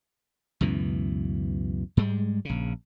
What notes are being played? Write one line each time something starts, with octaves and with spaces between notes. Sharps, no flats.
C#2 F#2 B2 E3
G#2 G3 G#3
A#1 C#3